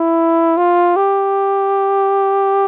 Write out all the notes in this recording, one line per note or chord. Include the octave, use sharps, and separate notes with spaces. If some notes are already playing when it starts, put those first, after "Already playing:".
Already playing: E4
F4
G4